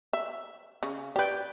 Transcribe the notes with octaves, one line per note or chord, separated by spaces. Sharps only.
E5
C#3
G4 B4 D5 G5